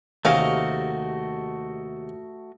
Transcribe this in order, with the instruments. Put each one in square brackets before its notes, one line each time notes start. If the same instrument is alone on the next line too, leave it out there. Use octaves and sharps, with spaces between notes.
[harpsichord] D#2 C3 [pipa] F#3 C#4 F5 [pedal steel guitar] A3 F#4 D#5